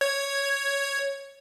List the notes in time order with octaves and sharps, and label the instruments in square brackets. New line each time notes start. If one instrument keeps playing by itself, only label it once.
[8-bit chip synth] C#5 G#6